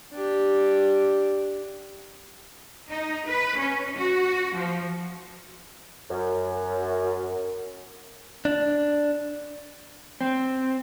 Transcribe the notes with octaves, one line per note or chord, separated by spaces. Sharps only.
D4 G4
D#4
B4
C#4
F#4
F3
F#2
D4
C4